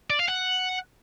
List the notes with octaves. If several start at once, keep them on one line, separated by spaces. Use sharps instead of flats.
D5
F5
F#5